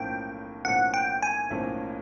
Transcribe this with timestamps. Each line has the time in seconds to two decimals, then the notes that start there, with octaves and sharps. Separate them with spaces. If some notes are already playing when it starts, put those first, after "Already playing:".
Already playing: B1 A2 F3 A#3 C#4 G5
0.65 B1 A2 F3 A#3 C#4 F#5
0.94 G5
1.22 G#5
1.50 B1 A2 F3 A#3 C#4